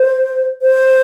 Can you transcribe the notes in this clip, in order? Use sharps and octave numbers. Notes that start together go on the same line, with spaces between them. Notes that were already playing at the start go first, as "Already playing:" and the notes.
Already playing: C5
C5